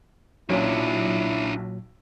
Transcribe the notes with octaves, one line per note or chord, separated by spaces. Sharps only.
B1 A#2 F#3 C#4 D4 E4 F4